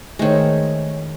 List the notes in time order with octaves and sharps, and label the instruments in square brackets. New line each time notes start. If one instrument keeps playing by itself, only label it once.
[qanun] D#3 G#3 [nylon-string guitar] A3 C5 C#5